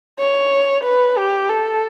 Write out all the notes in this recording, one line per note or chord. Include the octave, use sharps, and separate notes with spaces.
C#5
B4
G4
A4